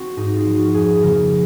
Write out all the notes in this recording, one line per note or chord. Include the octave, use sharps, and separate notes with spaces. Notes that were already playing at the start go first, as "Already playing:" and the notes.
Already playing: C4 F#4
G#2 D#4
F4
F3 C4
F#4
F2 G#4
C#3 F3 A#3 A#4